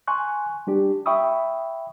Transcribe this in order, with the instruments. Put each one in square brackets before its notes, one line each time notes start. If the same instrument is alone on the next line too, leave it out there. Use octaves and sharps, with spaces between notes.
[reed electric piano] G#5 C6 C#6 F#6
G3 D4 G4
E5 G5 B5 C#6 D#6 E6